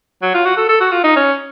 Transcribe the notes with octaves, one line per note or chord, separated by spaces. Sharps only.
F#3
F4
F#4
A4
A4
F#4
F4
D#4
C#4